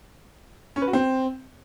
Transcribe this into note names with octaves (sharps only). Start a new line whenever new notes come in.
C#4
B4
F#4
C4